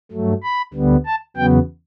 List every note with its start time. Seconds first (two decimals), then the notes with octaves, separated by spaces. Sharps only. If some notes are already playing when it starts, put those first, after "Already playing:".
0.11 G2 F#3 A3
0.43 B5
0.74 D2 D3 G3 B3
1.06 A5
1.36 E2 C#3 F#3 B3 G5